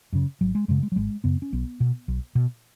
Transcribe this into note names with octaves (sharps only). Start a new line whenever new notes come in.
F#2 C#3
G#1 F#3
G#3
F#2 C#3 G#3
G#3
F#3
G#1 G#3
F#2 C#3 B3
C#4
B1 B3
B2
B1
B2